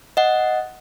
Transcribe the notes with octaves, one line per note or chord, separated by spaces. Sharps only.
D#5 F#5